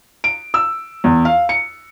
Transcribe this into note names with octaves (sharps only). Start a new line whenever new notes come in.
D7
E6
E2
F5
C#7